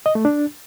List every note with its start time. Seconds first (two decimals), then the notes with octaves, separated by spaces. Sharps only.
0.06 D#5
0.15 A3
0.25 D4